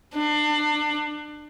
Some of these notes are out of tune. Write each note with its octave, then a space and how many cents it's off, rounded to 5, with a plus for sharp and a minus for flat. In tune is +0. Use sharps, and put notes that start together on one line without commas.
D4 +30